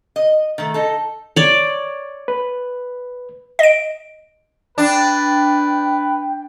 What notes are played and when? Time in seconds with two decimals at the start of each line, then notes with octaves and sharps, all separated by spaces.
0.16 D#5
0.58 D#3 A3
0.74 D#4 A4
1.36 C#5 D5
2.28 B4
3.59 D#5 D7
4.78 D4 B4 G5